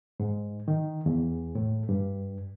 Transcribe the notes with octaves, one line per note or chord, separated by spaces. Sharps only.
G#2
D#3
E2
A2
G2